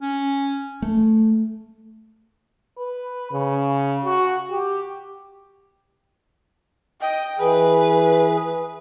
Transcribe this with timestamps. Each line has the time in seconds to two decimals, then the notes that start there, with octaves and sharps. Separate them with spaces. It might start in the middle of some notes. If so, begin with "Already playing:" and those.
0.01 C#4
0.82 A3
2.78 B4
3.32 C#3
4.05 F#4
4.52 G4
7.01 D#5 G5
7.39 E3 G#4 B4